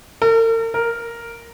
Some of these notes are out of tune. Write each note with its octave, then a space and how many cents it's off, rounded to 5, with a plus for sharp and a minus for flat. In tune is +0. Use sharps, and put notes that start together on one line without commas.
A#4 -45
A#4 +0